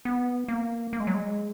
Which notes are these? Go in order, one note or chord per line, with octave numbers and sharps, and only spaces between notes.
B3
A#3
A#3
G#3
F#3
G#3